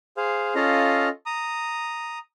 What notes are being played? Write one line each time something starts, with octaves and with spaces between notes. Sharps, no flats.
G#4 C5 F5
C#4 F4 A4 D#5 F5
A#5 D#6